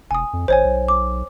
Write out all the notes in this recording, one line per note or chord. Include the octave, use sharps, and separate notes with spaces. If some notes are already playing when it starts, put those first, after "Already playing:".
E1 G#5 D#6
F2
G#1 C5 C#5 G#5
B1
D6